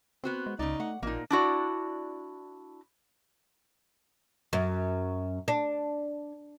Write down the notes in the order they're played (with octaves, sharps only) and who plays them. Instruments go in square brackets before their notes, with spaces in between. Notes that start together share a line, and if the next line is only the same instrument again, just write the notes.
[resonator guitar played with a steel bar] B3 F#4 C5 [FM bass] C4
[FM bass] G#3
[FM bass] C#2 [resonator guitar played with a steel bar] C#3 D5 [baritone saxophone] D#4
[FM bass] A3 [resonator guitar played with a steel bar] F#5
[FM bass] A1 [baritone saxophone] A#2 [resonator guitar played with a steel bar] A#3 D#4
[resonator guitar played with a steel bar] D4 E4 F#4 D5
[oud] F#2
D4